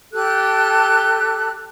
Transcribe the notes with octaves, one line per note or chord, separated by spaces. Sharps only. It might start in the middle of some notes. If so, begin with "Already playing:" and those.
G4 A4 F#6